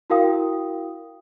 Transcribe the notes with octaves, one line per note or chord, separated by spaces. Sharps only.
E4 F#4 A#4 F5 G5 D#6